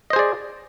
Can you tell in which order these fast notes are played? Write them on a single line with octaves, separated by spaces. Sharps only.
D#5 C5 G#4 D5